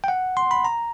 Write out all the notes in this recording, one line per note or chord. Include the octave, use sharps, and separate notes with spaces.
G5
F#5
C6
B5
A#5